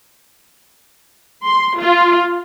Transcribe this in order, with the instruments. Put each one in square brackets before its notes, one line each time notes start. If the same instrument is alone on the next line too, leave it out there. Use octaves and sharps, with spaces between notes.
[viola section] C6
F4